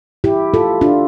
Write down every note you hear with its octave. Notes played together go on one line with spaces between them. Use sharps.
E4 G4
F4 A4
D4 F4